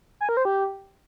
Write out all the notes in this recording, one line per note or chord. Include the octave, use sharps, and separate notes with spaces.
G#5
A#4
C5
G4